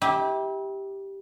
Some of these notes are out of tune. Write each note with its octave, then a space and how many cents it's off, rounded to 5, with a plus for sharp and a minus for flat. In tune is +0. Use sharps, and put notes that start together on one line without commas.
E4 -40 G4 +0